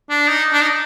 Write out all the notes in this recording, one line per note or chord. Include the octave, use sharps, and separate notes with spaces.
D4
D#4
D4
D#4